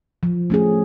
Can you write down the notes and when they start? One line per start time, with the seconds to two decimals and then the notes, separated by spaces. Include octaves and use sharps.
0.23 F3
0.50 A3 C#4 G#4